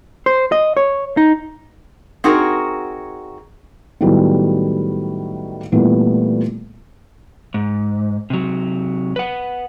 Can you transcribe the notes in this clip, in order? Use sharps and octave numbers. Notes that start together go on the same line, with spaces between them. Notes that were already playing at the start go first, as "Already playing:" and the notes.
C5
D#5
C#5
D#4
C4 D#4 F#4 G#4 A#4
A2 D#3 F#3 G3 B3
A#2 E3 G3 A3 B3
G#2
C3 F#3
B4 F#5